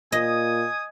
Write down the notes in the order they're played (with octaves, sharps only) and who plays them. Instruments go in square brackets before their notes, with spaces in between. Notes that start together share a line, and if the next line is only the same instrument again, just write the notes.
[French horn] A#2 [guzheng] D#5 [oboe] G#5 [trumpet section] D#6